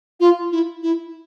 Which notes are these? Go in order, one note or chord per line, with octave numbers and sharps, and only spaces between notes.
F4
E4
E4